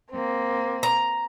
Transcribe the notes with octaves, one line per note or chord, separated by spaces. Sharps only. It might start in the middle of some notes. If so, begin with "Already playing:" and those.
A#3 C4
A#5